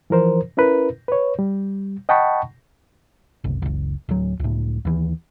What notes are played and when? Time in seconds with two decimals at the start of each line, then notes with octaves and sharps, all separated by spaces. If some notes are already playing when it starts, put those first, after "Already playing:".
0.10 E3 F3 A#4 C5
0.57 C#4 E4 A#4 B4
1.08 B4 C#5
1.39 G3
2.09 D#5 F#5 G5 A5 B5 C#6
3.44 F#1 C2
3.62 F#1 C#2
4.09 D1 F#3
4.40 C#2 A2
4.85 D#2 E3